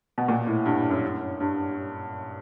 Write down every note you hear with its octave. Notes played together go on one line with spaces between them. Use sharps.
B2
A#2
A2
G2
F#2
G2